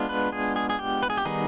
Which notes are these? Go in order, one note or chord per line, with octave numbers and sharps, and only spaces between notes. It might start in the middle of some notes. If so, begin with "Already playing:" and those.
Already playing: G#3 B3 D4 F4
B4
G#4
G#4
G#4
G4
B4
G#4
G4
D#3 G3 B3 D#4 G#4